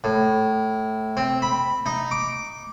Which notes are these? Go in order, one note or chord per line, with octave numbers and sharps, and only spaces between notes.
A2
C4
B5
D#4
D6